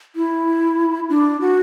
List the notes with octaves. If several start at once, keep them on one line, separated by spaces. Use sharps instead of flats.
E4
D4
F#4